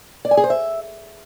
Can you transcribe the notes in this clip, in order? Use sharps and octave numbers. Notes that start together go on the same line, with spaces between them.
D5
G#5
G#4
C5
E5